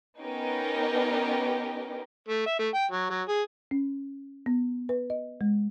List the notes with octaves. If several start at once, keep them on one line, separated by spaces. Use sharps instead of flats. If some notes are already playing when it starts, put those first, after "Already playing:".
B3 C#4 D#4 G4 A#4 B4
A3
E5
A3
G5
F#3
F#3
G#4
C#4
B3
B4
D#5
G#3